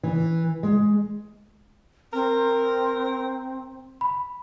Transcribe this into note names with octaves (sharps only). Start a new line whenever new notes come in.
E3
G#3
C4 A#4
B5